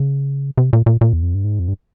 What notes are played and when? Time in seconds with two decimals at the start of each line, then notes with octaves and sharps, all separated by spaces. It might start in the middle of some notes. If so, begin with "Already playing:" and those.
Already playing: C#3
0.58 C3
0.73 A#2
0.86 A#2
1.01 A#2
1.13 E2
1.23 F2
1.34 G2
1.44 G#2
1.59 F2
1.68 G2